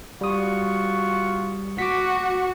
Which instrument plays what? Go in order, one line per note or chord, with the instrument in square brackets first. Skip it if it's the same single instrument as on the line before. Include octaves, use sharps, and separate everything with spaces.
[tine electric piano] G3 D#6 [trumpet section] F4 F#4 C#6
[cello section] F#4 [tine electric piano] D6 B6